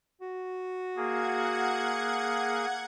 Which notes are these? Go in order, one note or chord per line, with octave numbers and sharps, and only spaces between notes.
F#4
A#3 G#4 F#5 G#6